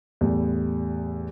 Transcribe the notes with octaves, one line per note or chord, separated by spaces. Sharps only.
E2 A2 G3